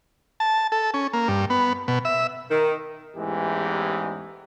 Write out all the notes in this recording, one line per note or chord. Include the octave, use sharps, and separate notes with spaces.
A5
A4
C#4
A#3
G2
B3
B2
E5
D#3
A1 E2 G#2 E3 G#3 G4